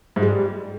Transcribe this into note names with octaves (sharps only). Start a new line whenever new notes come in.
G#2
G#3
G3